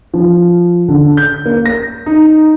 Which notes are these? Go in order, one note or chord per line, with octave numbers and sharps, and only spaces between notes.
F3
D3
G6
A#3
A#6
D#4